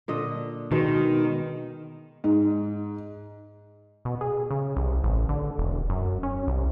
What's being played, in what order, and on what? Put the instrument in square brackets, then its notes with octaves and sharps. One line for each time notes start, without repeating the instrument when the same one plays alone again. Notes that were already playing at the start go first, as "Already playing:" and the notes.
[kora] A#2 D3 D#5
[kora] B2 G#3 [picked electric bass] D#3
[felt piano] G#2
[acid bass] B2
G#4
C#3
C2
A1
D3
E1
F#2
C#4
C2